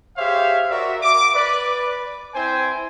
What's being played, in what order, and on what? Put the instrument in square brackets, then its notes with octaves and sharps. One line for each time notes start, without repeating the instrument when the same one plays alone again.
[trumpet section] G4 G#4 C5 C#5 E5 F5
F#4 A#4 D5 E5
D6
B4 D5
C4 E4 C5 G5 G#5